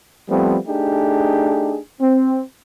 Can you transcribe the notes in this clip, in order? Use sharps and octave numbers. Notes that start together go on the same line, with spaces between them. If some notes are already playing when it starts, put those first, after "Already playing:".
F3 G3 A3 B3 C4
A3 D4 D#4 G4 G#4
C4